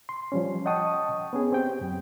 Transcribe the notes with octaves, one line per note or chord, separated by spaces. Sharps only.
C6
F3 G3 C#4
D#5 F#5 G5 A5 C#6 D#6
B3 C#4 G#4
C4 G4 G5
F#2 F#3